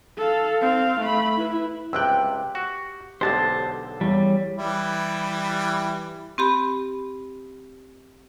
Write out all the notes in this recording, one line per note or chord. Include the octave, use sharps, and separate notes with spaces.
A4 F5
C4 F5
A3 B5
E4 B4
C#2 C3 G4 G5 E6 F#6
F#4
B1 D3 G#3 G4 A4 C5 A5
E2 C#3 G3
E3 G3 E4
C4 G4 B5